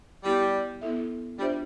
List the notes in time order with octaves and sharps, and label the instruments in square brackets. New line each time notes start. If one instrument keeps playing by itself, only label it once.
[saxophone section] G3 [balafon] B3 E4 G4
[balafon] B3 E4 A4 E5
[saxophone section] G3 [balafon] D4 F4 C5 E5